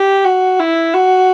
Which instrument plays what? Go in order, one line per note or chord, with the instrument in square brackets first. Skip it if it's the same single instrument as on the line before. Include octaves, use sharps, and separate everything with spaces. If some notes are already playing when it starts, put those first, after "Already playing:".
Already playing: [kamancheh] G4
F#4
E4
F#4